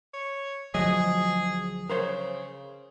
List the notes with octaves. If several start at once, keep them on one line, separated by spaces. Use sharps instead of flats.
C#5
D2 D#3 F3 F#3 G#4 D#5
C#3 A#4 C5 C#5